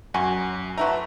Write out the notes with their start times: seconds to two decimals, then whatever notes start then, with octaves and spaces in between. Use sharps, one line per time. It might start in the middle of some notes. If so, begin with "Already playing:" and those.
0.14 F#2 F#4 G#5 C#6
0.78 A3 E4 F#4 B4 A#5